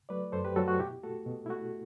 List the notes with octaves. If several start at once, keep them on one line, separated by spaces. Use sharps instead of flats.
F#3 A3 B4 D5
F#2 A4 C5
G4 B4
F#3 A3 F#4 A4
F#4
B2 E4 G4
A3 F#4 A4
B2
E4
A3 F#4